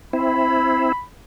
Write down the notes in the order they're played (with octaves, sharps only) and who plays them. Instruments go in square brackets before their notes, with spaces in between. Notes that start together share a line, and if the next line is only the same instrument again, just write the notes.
[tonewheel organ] C4 E4 [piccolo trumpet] B5